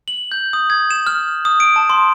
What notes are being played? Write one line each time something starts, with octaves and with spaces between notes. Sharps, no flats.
F#7
G6
D#6
G#6
E7
F6
D#6
D7
A5
C6